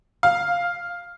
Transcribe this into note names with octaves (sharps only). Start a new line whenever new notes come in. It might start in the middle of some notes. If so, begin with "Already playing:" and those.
F5